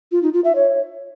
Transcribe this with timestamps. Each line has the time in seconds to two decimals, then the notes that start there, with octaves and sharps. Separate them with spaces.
0.12 F4
0.23 D#4
0.34 F4
0.44 E5
0.55 C#5